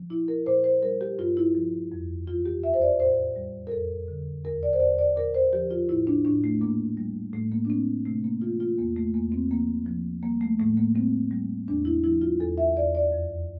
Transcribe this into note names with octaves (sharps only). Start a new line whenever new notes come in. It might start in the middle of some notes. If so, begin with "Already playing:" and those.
Already playing: F3
A#2 E4
A#4
A#2 C5
C5
G3 A#4
G4
G2 F4
E4
F3
F2
E3 F4
G4
E2 E5
C5
D5
A2 C5
G3
A#4
F2 A4
D3
E2 A#4
D5
C5
E2 D5
D5
A#2 A#4
C5
F3 G4
F4
A2 E4
D4
A2 D4
A3
A#2 A#3
G3
A2 A3
A#3
D4
A2 C4
C3 A3
A#3
E3 F4
F4
E2 A#3
A3
E2 A#3
C4
F3 A#3
F3
G3 A#3
A3
A2 A3
A#3
G3 C4
G3
E2 D4
E4
F3 E4
F4
E2 A4
E5
E2 D5
D5
F2